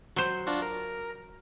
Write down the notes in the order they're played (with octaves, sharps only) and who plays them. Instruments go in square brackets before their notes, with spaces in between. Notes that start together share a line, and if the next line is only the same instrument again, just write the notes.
[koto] F#3 C5
[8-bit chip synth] D4 F4 F#4
A#4